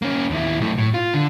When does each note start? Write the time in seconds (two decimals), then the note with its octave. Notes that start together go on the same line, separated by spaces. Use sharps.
0.02 A#3 C#4
0.30 D#2 E4
0.61 B1 A3
0.78 A2
0.94 F4
1.14 D3